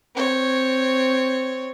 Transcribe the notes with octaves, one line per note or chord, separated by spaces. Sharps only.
C4 C#5